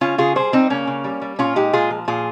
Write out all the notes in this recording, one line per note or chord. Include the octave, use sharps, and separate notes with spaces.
C#3 C#4 F4
C#3 F4 G#4
G3 G#4 C5
G3 C4 D#4
C#3 A#3 C#4
C#3
G3
G3
A#2 C#4 F4
G#3 D#4 G4
A#2 F4 G#4
F3
A#2 F4 G#4